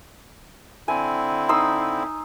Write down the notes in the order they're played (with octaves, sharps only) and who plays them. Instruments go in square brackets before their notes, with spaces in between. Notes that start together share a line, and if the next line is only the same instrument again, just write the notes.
[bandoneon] D3 C4 E4 [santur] G#5
[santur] D#4 C6 E6